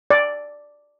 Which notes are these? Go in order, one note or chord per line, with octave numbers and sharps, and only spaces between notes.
D5